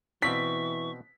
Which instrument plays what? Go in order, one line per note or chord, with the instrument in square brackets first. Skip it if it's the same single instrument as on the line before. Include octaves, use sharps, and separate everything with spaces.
[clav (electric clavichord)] B2 C4 D5 [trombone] E3 [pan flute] C#6 [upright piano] B6